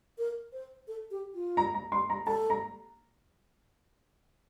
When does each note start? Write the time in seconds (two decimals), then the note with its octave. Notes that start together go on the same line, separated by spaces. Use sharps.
0.18 A#4
0.53 C5
0.88 A4
1.11 G4
1.35 F4
1.57 A#5
1.74 A#5
1.92 C6
2.10 A#5
2.27 A4 A5
2.50 A#5